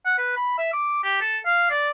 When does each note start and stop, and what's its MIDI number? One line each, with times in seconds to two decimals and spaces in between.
0.05 0.13 78
0.18 0.33 71
0.37 0.54 83
0.58 0.73 76
0.73 1.01 86
1.04 1.17 67
1.21 1.38 69
1.46 1.70 77
1.70 1.90 74